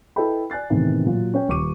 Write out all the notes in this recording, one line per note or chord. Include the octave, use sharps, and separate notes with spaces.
E4 A4 B4 D#5 G5 B5
D5 G#5 F#6 A6 C7
A2 C3 D#3 E3 B3
A#2 F#3 F4
C#4 C#5 G5
D#1 C#6 D6 D#7